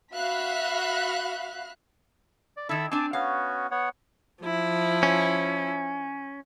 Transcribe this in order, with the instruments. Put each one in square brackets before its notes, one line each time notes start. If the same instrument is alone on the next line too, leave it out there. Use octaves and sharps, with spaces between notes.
[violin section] F#4 E5 F5 B5 F#6
[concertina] D5
[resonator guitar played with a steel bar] D#3 E4 [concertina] A4 B5 E6
[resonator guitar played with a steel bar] C4 D4 [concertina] G#5 A5 D6
[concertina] B3 C#4 F#4 [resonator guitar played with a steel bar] F5
[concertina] B3 C#5 F#5
[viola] F3 E4
[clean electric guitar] C#4